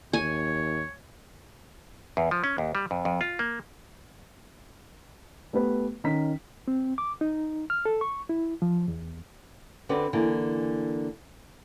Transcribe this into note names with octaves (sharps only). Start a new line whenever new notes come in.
D#2 C#5 G#5
E2
F3
C#4
D#2
G3
F2
F2
F4
A#3
A3 B3 G4 B4
D#3 C#4 A#5 B6
C4
D6
D#4
F6
A4
C#6
E4
F3
E2
D3 C4 F#4 B4 D5
D3 E3 A#3